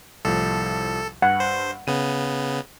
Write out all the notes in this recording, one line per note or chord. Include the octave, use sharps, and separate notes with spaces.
C2 A2 F3 A4
G2 F#5
C5
C#3 B3 D#7